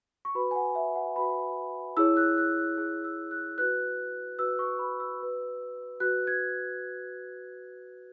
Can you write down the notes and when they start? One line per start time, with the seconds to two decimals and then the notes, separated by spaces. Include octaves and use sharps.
0.25 C#6
0.35 F#4 B4 B5
0.51 G#5
0.55 F#5
0.66 F#5
0.75 E5
0.96 F#5
1.16 F#4 B4 B5
1.97 E4 G#4 C#5 E6
2.17 F#6
2.38 F#6
2.51 E6
2.57 F#6
2.78 E4 G#4 C#5 F#6
3.04 E6
3.31 F#6
3.58 F#4 B4 F#6
4.39 F#4 B4 E6
4.59 C#6
4.79 B5
5.00 E6
5.20 F#4 B4
6.00 F#4 B4 F#6
6.27 G#6